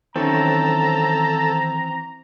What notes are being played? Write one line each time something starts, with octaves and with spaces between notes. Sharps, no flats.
D#3 E3 F#3 C4 C#4 A4 A#5